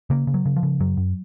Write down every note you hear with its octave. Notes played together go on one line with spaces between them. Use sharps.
C#3 A#3
C#3
F#3
C#3
F3
C#3
F#2 F#3
F#2